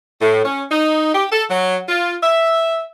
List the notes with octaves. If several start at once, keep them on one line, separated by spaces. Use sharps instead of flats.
A2
C#4
D#4
G4
A4
F#3
F4
E5